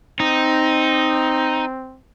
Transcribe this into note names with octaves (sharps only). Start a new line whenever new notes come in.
C4 D#4